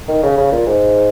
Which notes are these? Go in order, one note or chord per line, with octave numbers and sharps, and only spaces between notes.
D#3
C#3
C#3
A#2
G#2